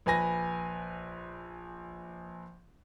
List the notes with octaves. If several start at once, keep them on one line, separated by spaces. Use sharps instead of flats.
A#1 B4 G#5 A#6